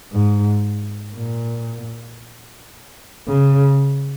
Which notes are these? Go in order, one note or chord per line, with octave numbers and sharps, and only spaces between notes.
G#2
A#2
C#3